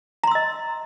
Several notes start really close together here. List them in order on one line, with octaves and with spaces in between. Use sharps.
A#5 C6 E6 D#5